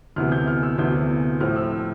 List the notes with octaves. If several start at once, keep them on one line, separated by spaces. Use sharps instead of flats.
D2 C3 E3 B3 F6
G6
F6
E6
D2 C3 E3 B3 G6
A2 F3 C4 F6
E6